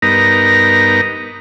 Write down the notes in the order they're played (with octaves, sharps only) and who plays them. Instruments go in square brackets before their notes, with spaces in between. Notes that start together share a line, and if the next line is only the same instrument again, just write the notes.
[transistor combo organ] G2 B3 D#4 A#4 A#5